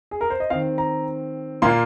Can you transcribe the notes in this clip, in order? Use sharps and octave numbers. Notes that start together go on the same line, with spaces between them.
G#4
A#4
C5
D#5
D#3 C4 F5
A#5
A#2 A#3 C6